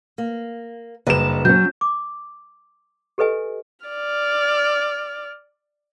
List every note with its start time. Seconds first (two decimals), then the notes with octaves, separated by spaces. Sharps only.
0.18 A#3
1.07 F#1 G2 B4 D#5 E7
1.45 F#3 C#4 G6
1.81 D6
3.18 G4 A4 B4 D#5 G#5
3.85 D5 F6